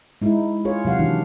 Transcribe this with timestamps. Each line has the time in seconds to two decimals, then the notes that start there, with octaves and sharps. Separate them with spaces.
0.22 G#3 D#4 E4
0.65 F4 G#4 C#5
0.85 C3 F#3 F5 F#5
0.99 D#3 E3 D4